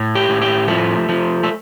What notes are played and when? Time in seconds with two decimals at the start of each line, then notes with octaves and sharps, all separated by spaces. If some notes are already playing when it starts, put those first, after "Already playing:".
Already playing: A2
0.15 G4
0.29 A2
0.42 G4
0.68 F3 A3
1.09 F3
1.44 A3